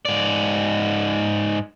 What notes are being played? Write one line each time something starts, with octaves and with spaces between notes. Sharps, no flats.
G#2 D5